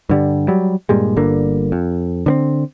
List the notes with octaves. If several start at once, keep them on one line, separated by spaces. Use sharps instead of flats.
G2 D3 G3
F#3 G3
G2 A#2 G3 G#3
G1 G2 D3 A#3
F2
D3 B3 C4